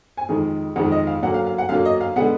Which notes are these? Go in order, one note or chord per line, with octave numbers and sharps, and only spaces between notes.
G#5
F2 D#3 G#3
F2 D#3 G#3 F#5
D#5
F5
F#2 D3 F#3 A#3 F#5
F5
F5
F#5
F#2 D3 F#3 A#3 F5
D#5
F5
D3 G#3 B3 F#5